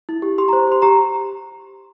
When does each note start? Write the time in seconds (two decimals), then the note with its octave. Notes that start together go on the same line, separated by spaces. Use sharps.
0.09 E4
0.22 G4
0.38 G4 C6
0.48 A#5
0.53 C5
0.67 G4 C6
0.82 G4 A#5